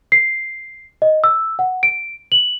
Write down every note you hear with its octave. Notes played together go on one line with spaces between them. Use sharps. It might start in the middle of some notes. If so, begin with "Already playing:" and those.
C7
D#5
E6
F#5
D7
F#7